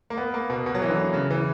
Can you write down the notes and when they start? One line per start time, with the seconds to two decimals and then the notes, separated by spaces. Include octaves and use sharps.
0.10 A#3
0.17 B3
0.34 A#3
0.50 B2
0.66 B2
0.75 F#3
0.82 E3
0.90 D3
1.13 C#3
1.30 E3